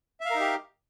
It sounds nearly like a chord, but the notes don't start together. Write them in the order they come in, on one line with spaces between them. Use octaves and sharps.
E5 F5 A#4 D#4 G4